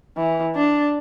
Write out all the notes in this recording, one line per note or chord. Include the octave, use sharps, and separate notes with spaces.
E3
D4